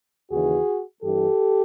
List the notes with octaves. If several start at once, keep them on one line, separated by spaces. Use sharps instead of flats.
D#2 C#3 E3 F#4 G#4
G2 E3 G4 A4